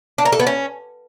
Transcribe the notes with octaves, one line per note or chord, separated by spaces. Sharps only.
D4
A#4
A4
B3
C#4